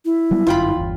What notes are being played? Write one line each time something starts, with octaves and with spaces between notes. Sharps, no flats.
E4
F#3 G3 B3
G1 F#2 D3 F4 G5 B5
G1 E2